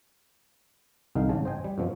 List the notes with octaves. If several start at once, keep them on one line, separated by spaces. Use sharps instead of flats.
C2 D3 D#3 G#3 D#4 F5
G#1 C#3 A5
C5 D#5 G5 G#5
G3
F#2 B2 F3